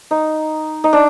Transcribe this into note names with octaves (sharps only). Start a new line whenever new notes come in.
D#4
D#4
D4